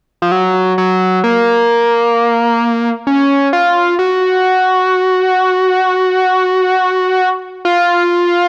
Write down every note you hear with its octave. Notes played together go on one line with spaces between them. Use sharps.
F3
F#3
F#3
A#3
C#4
F4
F#4
F4